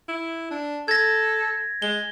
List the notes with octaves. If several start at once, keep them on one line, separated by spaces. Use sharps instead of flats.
E4
D4
A4 G#6 A#6
G#3 G7